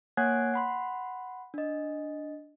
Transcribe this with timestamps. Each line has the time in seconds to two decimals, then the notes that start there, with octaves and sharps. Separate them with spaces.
0.17 A#3 C#5 F#5 G#5 F#6 G#6
0.54 F#5 B5 C6
1.54 D4 D#5